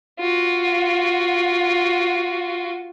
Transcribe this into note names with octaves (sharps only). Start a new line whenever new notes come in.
F4 F#4